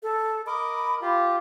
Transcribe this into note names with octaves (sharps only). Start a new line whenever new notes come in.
A4
A#4 D#5 B5 D6
F4 G4